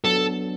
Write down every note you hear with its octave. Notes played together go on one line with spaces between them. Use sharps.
F#3 B3 D4 A4